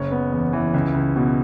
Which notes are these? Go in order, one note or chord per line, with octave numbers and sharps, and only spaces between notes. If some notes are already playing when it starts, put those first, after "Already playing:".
Already playing: F#1 C#5
B3
E2
E3
C#2
C#2
B2